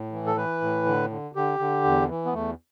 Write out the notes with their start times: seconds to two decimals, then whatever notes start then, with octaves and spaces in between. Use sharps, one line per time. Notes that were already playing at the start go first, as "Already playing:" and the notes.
Already playing: A2
0.12 E3
0.27 A4
0.36 E3 B4
0.61 A2
0.86 D3
1.10 D3
1.35 D3 G4
1.59 D3
1.84 E2
2.09 E3
2.25 B3
2.33 E2 A3